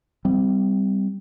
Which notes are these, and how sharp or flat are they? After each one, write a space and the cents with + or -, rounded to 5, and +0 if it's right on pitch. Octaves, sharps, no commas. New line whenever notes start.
G3 +0 C4 -20